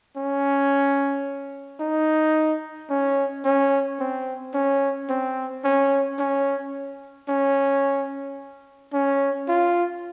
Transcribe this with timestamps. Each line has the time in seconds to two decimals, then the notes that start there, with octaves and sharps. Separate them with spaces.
0.17 C#4
1.80 D#4
2.90 C#4
3.45 C#4
4.00 C4
4.54 C#4
5.10 C4
5.65 C#4
6.19 C#4
7.29 C#4
8.93 C#4
9.48 F4